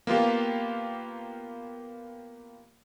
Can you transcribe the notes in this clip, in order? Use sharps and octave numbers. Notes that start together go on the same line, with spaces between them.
A#3 B3 F4 G4